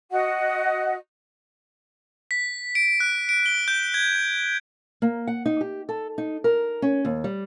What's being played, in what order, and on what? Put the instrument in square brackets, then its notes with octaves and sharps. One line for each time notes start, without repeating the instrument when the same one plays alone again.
[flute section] F#4 D#5 F#5
[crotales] B6
D7
F#6
D7
G7
G6
G#6
[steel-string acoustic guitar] A#3
F#5
D#4
G4
A4
D#4
A#4
C#4
D#2
G3